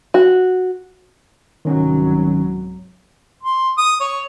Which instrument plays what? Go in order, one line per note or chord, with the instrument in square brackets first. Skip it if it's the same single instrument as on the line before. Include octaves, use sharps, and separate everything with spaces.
[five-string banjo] F#4
[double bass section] C2 G#2 F#3 [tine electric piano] D#3 C#4
[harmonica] C6
D#6
C#5